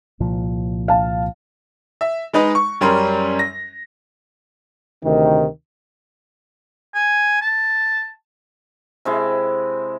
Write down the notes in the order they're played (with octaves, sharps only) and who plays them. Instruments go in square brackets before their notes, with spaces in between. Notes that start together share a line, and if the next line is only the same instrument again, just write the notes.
[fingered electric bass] C2 A#2 F3
[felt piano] F5 A5
[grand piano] E5
G#3 D#4 B4 D#5
C#6
F#2 G3 C#4 A#4 C6
A#6
[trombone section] D2 C3 D#3
[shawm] G#5
A5
[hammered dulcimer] C3 G#3 E4